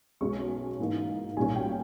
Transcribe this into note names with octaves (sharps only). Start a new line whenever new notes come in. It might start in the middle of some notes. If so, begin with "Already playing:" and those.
B1 B2 G#3 C#4 C#6
G#2 E3 A#3 D#4
B1 A#2 G3 C#4 G#5
G5